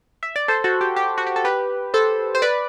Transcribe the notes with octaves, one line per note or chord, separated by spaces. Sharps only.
E5
D5
A4 C5
F#4 A4
G4
G4
F#4
G4
A4
G4 B4
A4 C5
C5
B4 D5